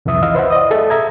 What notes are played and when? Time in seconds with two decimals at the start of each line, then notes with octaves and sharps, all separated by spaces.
0.06 C2 F2 E3 E5 D#6
0.23 E4 D#5 F5 E6
0.35 B4 C5 E5 F#5
0.50 D5 D#5 D#6
0.70 G#4 A4 E5 A5
0.90 E5 A#5 G#6